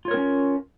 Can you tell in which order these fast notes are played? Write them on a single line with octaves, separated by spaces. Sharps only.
F4 C#5 A#4 C4 C#4